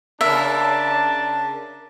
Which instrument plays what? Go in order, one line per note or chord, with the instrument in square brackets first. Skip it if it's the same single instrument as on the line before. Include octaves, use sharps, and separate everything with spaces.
[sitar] C#3 A#4 [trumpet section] D4 A5 [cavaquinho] E5